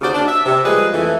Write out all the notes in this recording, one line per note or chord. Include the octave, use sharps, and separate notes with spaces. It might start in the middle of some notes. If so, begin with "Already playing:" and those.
D#2 C#3 F#4 C5 D5
D4
E5
C3
F3 G3 G#3 A#3 G#4 B4
F2 E3 A3